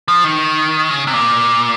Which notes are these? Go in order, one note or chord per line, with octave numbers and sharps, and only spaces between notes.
F3
D#3
C#3
C3
A#2